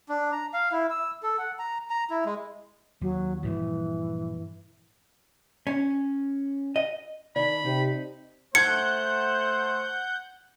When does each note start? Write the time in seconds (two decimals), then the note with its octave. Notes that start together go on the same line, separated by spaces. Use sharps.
0.09 D4
0.32 A#5
0.54 F5
0.72 E4
0.90 E6
1.23 A4
1.38 F#5
1.59 A#5
1.90 A#5
2.10 E4
2.25 G#3
3.01 D#2 F#3
3.43 G2 A#2 E3 F3
5.67 C#4
6.76 D#5
7.36 D#3 D4 D5 B5
7.65 C3 D#4
8.55 A3 C5 F#5 G6 G#6 C#7